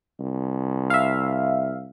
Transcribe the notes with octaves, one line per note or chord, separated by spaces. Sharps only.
C2
E5 F5